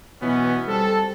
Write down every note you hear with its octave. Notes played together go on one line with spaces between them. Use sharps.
B2 E3 F#3 B3 C#4
G3 C4 A4